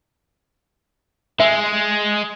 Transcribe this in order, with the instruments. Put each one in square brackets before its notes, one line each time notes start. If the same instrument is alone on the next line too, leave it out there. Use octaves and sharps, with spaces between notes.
[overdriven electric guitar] G#3 [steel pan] E5